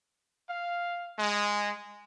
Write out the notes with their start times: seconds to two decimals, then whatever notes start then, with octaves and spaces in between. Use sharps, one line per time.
0.49 F5
1.18 G#3